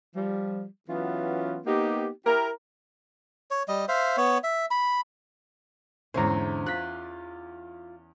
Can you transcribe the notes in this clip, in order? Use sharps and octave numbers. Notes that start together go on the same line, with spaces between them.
F3 G3
E3 F#3 B3 C#4 F4
A#3 B3 D#4 G4
E4 G4 A#4
C#5
G3 D#5
C5 E5 F5
B3 C#5
E5
B5
E2 G#2 D3 C#4 C5 E5 A#5
F4 F#6 B6